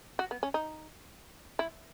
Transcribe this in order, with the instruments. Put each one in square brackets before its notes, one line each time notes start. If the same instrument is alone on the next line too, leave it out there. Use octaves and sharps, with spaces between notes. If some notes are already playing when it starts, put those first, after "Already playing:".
[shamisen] F#4
B3
C#4
D#4
E4